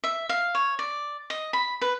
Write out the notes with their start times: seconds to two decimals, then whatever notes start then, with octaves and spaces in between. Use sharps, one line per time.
0.04 E5
0.29 F5
0.55 C#5
0.79 D5
1.30 D#5
1.53 B5
1.81 B4